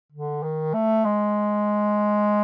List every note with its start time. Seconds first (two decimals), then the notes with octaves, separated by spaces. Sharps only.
0.12 D3
0.43 D#3
0.74 A3
1.05 G#3